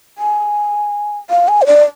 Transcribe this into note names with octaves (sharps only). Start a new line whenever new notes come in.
G#5
F5
G#5
C5
D5